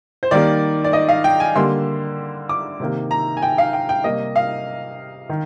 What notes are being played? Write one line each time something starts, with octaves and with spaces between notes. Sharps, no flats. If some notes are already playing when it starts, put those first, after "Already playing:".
C5
D#3 G3 A#3 D5
D5
D#5
F5
G5
G#5
D3 G3 A#3 C6
D6
C3 D#3 A#3
A#5
G#5
G5
F5
G5
G5
C3 G3 A#3 D#5
F5
D#3